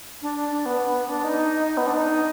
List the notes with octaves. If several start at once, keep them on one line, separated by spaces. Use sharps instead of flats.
D4
D4
B3
D4
D#4
B3
D4
D#4